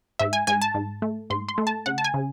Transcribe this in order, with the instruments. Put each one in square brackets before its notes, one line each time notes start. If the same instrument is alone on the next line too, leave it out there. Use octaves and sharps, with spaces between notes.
[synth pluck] G#2 E5
G#5
G#2 G#5
A5
G#2
A3
G#2 C6
C6
A3
A5
C#3 F#5
A5
G#5
C#3